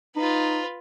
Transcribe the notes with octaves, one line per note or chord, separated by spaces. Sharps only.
D#4 F4 B4